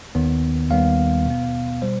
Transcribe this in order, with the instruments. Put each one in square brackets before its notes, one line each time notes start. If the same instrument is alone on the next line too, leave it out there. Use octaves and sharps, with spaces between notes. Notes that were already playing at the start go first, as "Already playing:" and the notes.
[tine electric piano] D#2 D#3 B3
D#2 D#3 G3 B3 F5
B2 B3
B2 G3 C5